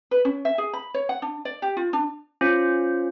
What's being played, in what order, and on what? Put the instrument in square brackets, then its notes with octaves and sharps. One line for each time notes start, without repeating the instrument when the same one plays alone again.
[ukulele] B4
C#4
E5
G#4
B5
C#5
F#5
D4
D5
G4
F4
D4
[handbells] C#4 F4 C5